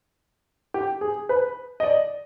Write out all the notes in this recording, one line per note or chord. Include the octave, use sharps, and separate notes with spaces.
G4
G#4
B4
D#5
D5